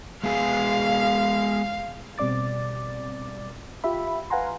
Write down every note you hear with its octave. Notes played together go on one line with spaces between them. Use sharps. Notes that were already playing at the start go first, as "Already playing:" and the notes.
G#3 B3 G#4 F5
B2 G3 C4 D5 D6 A6
F4 G4 E5 B5
B4 F5 F#5 G#5 A#5 C6